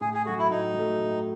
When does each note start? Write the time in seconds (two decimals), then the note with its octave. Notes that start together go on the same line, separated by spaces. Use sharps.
0.01 A2 G#4
0.14 G#4
0.26 F#3 A3 F#4
0.39 E4
0.50 A2 D#4
0.74 F#3
0.79 A3
1.00 A2